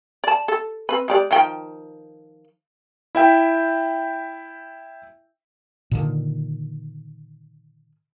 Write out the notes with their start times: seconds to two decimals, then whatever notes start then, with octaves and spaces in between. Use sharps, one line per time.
0.24 D5 A5
0.48 A4
0.89 C4 B4
1.08 G#3 G4 D5
1.31 D#3 F3 G5
3.15 E4 E5 G5
5.91 A#2 D3 D#3